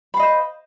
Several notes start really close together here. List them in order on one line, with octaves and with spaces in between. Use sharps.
B5 F5 D#5 C5